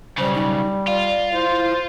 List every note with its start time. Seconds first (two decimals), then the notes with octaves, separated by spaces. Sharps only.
0.18 B1 C#3 G3 C5
0.35 D#4
0.88 F4 D5
1.33 E4 C5
1.50 E4